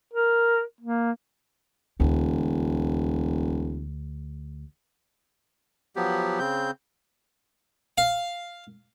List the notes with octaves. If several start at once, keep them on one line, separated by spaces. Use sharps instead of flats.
A#4
A#3
E1 D2
F3 F#3 B3 G4
C#3 C4 G6
F5